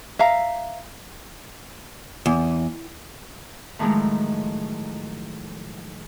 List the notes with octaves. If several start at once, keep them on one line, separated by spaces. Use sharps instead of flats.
E5 F5 A#5
E2
A2 D#3 F3 F#3 G#3 A3